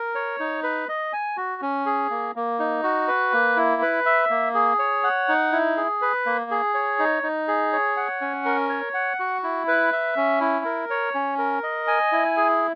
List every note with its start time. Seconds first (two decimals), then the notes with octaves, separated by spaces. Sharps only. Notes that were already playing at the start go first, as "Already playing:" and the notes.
Already playing: A#4
0.15 C#5
0.40 D#4
0.63 B4
0.89 D#5
1.13 G#5
1.37 F#4
1.62 C#4
1.86 G#4
2.10 A#3
2.36 A#3
2.59 D#4
2.83 F#4
3.08 B4
3.33 A#3
3.56 E4
3.82 B4
4.06 E5
4.30 A#3
4.54 G#4
4.79 C#5
5.03 F#5
5.28 D#4
5.52 E4
5.77 G#4
6.02 B4
6.26 A#3
6.51 G#4
6.74 C#5
6.99 D#4
7.23 D#4
7.48 G#4
7.73 C#5
7.97 F#5
8.21 C#4
8.45 A#4
8.69 C#5
8.94 F#5
9.19 F#4
9.43 E4
9.68 B4
9.92 E5
10.16 C#4
10.40 E4
10.65 A#4
10.90 C#5
11.14 C#4
11.38 A#4
11.63 D#5
11.87 G#5
12.12 E4
12.37 G#4